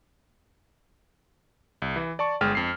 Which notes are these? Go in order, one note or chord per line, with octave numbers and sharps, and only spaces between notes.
C2
E3
D5 A5 C#6
G1 G#3 G5 F6
F2 C7